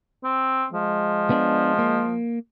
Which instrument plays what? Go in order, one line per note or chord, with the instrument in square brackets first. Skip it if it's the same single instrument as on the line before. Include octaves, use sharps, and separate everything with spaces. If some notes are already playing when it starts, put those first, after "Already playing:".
[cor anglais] C4
[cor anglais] F3 [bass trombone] G#3
[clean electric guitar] B3 D4
A#3